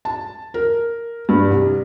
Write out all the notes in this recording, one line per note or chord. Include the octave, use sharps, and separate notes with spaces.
A5
A#4
G2
C2